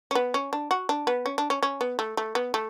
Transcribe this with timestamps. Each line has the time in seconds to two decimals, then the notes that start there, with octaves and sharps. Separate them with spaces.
0.11 C#4
0.15 B3
0.34 C#4
0.53 D4
0.71 F#4
0.89 D4
1.07 B3
1.26 C#4
1.38 D4
1.50 C#4
1.63 C#4
1.81 B3
1.99 A3
2.17 A3
2.35 B3
2.54 A3